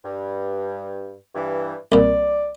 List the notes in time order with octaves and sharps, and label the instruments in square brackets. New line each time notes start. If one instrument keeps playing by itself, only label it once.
[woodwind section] G2
G2 E3
[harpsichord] C2 A#2 [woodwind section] D5